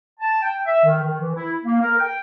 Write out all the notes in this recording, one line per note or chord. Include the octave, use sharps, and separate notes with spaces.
A5
G5
E5
D#3
D#3
E3
E4
A#3
A#4
G5